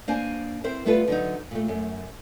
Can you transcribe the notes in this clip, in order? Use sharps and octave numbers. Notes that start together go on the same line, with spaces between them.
A#3 D4 C5 G#5
C4 E4 A#4 C5
G3 A3 B3 F4 A4 B4
D3 F#3 D#4
A#2 A3
F#2 A3